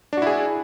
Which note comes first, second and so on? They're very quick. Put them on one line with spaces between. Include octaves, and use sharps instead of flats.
D4 F#4 E4 G#4